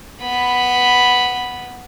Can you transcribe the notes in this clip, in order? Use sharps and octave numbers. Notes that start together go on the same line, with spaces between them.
B3 B5